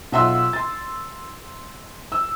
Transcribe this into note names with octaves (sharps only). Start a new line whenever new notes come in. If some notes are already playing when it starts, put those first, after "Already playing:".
B1 F4 E5 F#5 C6 E6
C6 A6
E6